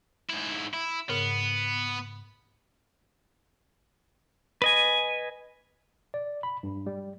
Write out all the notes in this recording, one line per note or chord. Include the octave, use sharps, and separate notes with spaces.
G#2 E4
E4
G#2 C#3 B3 A#4
B4 D#5 G#5
D5
B5
G2
G3